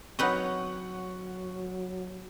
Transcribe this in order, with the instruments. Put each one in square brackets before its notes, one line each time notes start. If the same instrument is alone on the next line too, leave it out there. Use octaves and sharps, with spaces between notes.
[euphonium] F#3 [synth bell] C4 C#5 [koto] D#4 B4 D#5 [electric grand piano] F#5 C#6